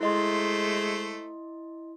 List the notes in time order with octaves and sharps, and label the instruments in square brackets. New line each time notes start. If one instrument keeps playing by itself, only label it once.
[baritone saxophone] G#3 [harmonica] A3 C5 [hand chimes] E4 D#5 C6